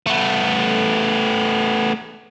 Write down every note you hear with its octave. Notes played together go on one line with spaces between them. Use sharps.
A3 B3